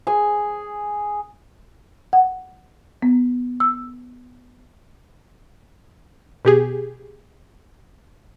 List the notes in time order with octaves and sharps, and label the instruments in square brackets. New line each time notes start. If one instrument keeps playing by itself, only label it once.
[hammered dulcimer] G#4 G#5
[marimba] F#5
B3
E6
[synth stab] B2 G4 G#4